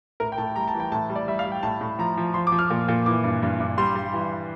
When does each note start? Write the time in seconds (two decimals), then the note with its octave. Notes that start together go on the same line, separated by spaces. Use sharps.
0.20 A2 A#4
0.32 G5
0.38 A2 A5
0.56 G3 A#5
0.68 A5
0.74 E3
0.80 G5
0.92 A2 A5
1.10 G3
1.16 D5
1.27 G3 E5
1.39 F5
1.45 G3
1.52 G5
1.63 A2 A5
1.81 A2
1.99 F3 A#5
2.17 F3
2.34 F3 C6
2.47 D6
2.52 F3
2.59 F6
2.70 A#2
2.88 A#2
3.06 E3 D6
3.24 G2
3.42 G2
3.60 G2
3.78 G3 C6
3.95 G3
4.13 E3